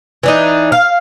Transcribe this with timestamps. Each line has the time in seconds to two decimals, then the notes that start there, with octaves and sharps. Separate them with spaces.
0.23 E3 D4 D#4
0.72 F5